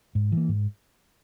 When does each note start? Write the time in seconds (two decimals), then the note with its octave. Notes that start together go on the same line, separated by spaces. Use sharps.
0.15 G#2
0.32 E3 A#3
0.49 G#2